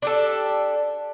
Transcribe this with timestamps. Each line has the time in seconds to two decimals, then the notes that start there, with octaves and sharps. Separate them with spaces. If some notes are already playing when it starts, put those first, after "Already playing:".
0.02 D4 G4 A4